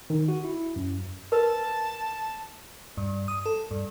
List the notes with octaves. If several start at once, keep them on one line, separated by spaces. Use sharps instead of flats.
D#3
F#4
E4
F#2
A#4 B4 A5
G2
D#6
A4
G2